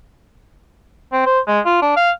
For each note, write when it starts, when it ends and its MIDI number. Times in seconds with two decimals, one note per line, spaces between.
1.13 1.21 60
1.26 1.39 72
1.48 1.60 56
1.66 1.79 65
1.82 1.92 62
1.97 2.11 77